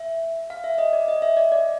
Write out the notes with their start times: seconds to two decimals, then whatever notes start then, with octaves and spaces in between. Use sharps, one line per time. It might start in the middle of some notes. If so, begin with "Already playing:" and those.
Already playing: E5
0.50 F5
0.64 E5
0.78 D#5
0.93 D5
1.08 D#5
1.22 E5
1.37 D5
1.52 D5